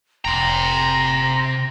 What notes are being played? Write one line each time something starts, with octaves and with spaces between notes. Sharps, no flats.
F1 C3 G5 A#5 C6 A#6